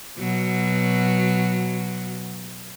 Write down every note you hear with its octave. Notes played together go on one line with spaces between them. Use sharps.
B2 F#3